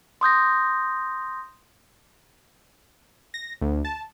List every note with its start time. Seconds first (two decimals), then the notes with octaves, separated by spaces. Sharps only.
0.21 C6 D#6 G6 A#6
3.34 A#6
3.61 D2
3.85 A5